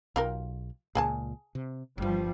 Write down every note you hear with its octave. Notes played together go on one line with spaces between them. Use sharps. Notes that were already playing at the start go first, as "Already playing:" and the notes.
B1 F4 G4 A#4
C#2 A#2 G#4 G#5 A5
C3
G1 G2 F3 G3